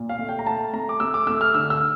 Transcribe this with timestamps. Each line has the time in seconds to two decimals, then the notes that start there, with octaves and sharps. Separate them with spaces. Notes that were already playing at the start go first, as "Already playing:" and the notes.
Already playing: A#2
0.09 F5
0.19 A3
0.29 G5
0.39 A#5
0.47 A3 A5
0.73 A3 A#5
0.89 D6
1.00 A3 E6
1.14 D6
1.27 A3 E6
1.41 F6
1.54 D3 E6
1.70 E6